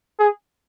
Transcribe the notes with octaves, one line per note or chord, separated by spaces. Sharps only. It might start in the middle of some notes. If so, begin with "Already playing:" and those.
G#4